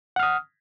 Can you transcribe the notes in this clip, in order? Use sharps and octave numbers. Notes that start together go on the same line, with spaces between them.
F#5 D#6 F6